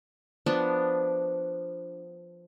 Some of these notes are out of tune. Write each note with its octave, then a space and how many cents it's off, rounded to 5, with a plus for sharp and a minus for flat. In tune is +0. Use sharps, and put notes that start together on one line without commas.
F3 +0 B3 +0 D4 +0